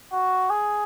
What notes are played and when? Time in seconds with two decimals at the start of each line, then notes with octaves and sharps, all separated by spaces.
0.13 F#4
0.50 G#4